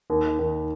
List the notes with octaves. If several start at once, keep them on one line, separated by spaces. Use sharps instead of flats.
D#2 D#3
D#2 D#3